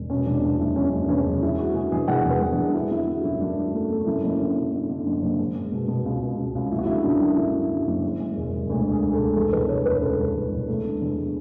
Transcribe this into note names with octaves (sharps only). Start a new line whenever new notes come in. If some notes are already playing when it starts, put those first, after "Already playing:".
Already playing: E1
B2 C#4
E2 D4
B2
F#1 E4
F#1 C#4
F#1 D4
E2 C#4
F#1 D4
G#3 E4
G#3 F#4
D3 G#4
E2 G#4
E2 F#5
E2
B4
E2
D4
E2
D3 E4
D3 E4
D3 F#4
F#2 E4
F#2 D4
D3
A3
A3
F#2 E4
F#1
D3
D3
D3
D3
F#1
F#1
G#3
G#3
B2
B2
C#2
C#2
C#2
C#2
F#1 E4
F#4
D3 E4
F#2 D4
F#2
D3 E4
D3
D3
F#1
G#3
G#3
E1
E1
D2
D3
G#4
G#3
A4
D2
E2 A4
E2 B4
E1 C#5
E1 B4
C#3 A4
E1
E1
E1
A3
D3
E2